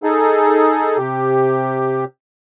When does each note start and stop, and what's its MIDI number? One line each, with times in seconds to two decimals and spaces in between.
0.03 0.97 63
0.03 0.97 68
0.03 0.97 69
0.97 2.05 48
0.97 2.05 67